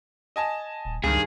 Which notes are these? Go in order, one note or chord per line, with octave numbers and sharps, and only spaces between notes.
D#5 G#5 A5
D#1
C#2 G2 D#3 G#4